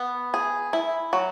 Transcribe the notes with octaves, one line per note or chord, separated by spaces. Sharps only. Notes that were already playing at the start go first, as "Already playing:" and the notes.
Already playing: B3
G#4
E4
F#3